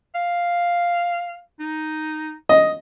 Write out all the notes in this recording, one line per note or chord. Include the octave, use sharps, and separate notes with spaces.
F5
D#4
D#5